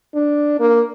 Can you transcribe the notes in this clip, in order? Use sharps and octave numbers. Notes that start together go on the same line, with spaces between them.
D4
A#3